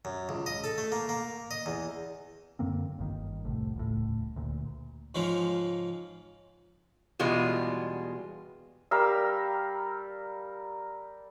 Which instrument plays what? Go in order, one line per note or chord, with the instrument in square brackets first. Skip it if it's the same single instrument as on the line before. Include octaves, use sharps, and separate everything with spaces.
[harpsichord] F#2
C#2
D#5
A4
A3
A#3
A#3
D#5
E2
[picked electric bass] F#2 D3 A#3 C4
G1 G2 D#3
F1 C2 A2
D#1 C#2 A2
D2 A#2
[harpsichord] G#2 C#3 F3 G#3
[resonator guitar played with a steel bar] E2 B2 G3 G#3 F4
[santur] G3 A#4 F5 E6